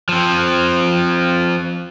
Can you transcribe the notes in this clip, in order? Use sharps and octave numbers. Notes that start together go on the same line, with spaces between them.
F3 C4